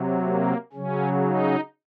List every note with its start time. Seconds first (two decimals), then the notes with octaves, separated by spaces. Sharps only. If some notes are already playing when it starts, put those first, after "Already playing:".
Already playing: C3 F#3
0.22 A#3
0.73 C#3 F#3 C#4
1.24 D#4